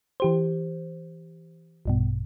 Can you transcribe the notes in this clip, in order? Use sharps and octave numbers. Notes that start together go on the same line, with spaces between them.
E3 G4 C5
A#1 G2 B2